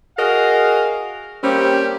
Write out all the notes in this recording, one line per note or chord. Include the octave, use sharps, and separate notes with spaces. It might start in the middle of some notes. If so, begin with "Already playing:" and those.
F#4 G#4 A#4 D#5 F5
G3 A#3 C4 C#4 G4